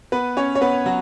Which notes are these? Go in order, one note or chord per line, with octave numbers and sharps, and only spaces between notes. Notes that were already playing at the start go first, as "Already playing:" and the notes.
B3 B4
C#4 C#5
C#5
B3 B4
F#3 F#4